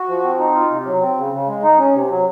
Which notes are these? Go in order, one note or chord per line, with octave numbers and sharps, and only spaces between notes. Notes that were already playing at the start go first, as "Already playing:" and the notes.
Already playing: F#4
F3
C4
D#4
F4
C3
F#3
C4
C#3
C#3
G#3
D#4
C#4
C3
F#3